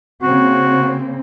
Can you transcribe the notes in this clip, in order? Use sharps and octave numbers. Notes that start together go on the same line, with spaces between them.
C#3 A#3 C4 F#4